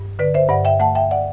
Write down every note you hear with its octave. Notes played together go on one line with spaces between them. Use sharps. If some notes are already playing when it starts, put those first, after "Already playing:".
Already playing: G2
D3 B4 D5
C5 E5
G2 D5 F#5
E5 G5
A3 F#5 A5
E5 G5
D5 F#5